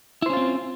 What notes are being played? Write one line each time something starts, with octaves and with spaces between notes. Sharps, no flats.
C4 C#4 E4 F4 C5